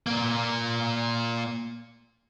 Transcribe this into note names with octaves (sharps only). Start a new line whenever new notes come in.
A#2 A#3